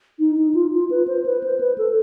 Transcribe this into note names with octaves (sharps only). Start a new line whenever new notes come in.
D#4
D#4
F4
F4
B4
C5
B4
C5
B4
A4